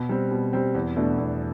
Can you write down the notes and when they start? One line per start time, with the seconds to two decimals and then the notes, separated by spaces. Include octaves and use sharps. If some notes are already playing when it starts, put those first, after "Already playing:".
Already playing: B2
0.09 G3 C4
0.32 B2
0.53 G3 C4
0.75 E2
0.96 B2 A3 D4
1.18 E2